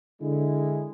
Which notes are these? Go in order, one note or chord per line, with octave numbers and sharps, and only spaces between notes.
D3 G#3 E4